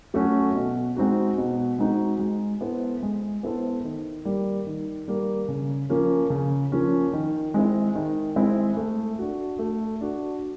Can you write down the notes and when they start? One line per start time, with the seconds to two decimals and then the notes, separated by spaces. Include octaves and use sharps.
0.14 F#3 A3 C#4 F#4
0.56 B2
0.96 G#3 C4 D#4 F#4
1.38 B2
1.79 G#3 C4 D#4 F#4
2.19 G#3
2.61 B3 E4 A4 C5
3.03 G#3
3.43 B3 E4 A4 C5
3.84 D#3
4.25 G3 A#3
4.66 D#3
5.08 G3 A#3
5.48 C#3
5.90 F3 A#3 C#4
6.30 C#3
6.72 F3 A#3 C#4
7.13 D#3
7.54 G#3 C4 E4
7.95 D#3
8.36 G#3 C4 E4
8.77 A3
9.19 D4 F#4
9.59 A3
10.01 D4 F#4